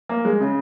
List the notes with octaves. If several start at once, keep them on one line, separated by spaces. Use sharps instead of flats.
A#3
G#3
C#3